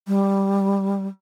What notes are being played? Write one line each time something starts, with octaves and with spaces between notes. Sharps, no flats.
G3